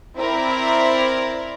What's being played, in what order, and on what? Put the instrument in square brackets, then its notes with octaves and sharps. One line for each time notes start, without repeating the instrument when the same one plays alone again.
[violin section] C4 E4 A#4 D5